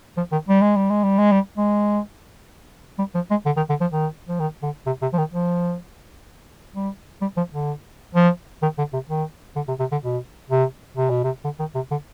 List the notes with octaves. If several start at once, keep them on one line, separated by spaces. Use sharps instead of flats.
F3
D#3
G3
G#3
G3
G#3
G3
G#3
G3
G#3
G3
F3
G#3
D3
D#3
D3
F3
D#3
F3
D#3
D3
C3
C3
F3
D#3
F3
G3
G3
F3
D3
F3
D#3
D3
C3
D#3
D3
C3
C3
D3
B2
C3
C3
B2
C3
D3
D#3
C3
D3